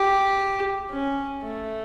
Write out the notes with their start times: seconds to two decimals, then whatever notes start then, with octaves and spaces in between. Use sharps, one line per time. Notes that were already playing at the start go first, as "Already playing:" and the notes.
Already playing: G4
0.91 C#4
1.43 A3